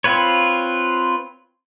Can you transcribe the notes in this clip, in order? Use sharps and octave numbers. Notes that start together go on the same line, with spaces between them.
C4 F4 B4 C#5